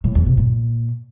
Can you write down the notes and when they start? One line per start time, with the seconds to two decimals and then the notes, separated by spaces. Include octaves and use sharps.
0.04 A2
0.15 E2
0.26 C3
0.37 A#2